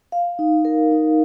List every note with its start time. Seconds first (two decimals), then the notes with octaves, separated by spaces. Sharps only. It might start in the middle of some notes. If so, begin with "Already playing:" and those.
0.12 F5
0.39 D#4
0.65 A#4
0.91 D#4